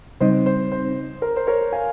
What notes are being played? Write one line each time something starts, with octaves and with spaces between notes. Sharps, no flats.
C#3 G3 C4 D#4 C5 D#5
C5
C5
A#4
C5
A#4 C#5
F5 G#5